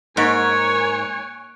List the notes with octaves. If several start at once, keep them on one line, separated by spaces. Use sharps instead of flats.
G#2 A#3 A#4 C#5 G#5 F#6 D7